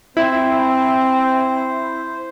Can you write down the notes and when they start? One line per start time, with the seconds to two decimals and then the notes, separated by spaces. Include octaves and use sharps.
0.17 C4 E4 C5